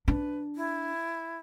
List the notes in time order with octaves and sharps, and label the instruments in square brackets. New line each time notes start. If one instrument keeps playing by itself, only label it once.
[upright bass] D4 [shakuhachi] B4
[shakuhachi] E4